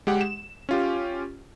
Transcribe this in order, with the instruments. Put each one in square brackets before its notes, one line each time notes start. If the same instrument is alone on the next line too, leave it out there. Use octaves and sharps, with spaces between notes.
[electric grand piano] G#3 G4 F#5
E7
C#4 F4 G4